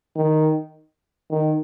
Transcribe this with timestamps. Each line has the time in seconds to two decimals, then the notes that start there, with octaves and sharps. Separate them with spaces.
0.16 D#3
1.30 D#3